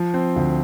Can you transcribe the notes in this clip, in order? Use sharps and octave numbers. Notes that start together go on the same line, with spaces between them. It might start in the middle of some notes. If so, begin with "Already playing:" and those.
Already playing: F3
C4
D2